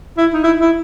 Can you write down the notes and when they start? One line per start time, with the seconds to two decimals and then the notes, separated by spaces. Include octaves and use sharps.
0.17 E4
0.34 D#4
0.44 E4
0.60 E4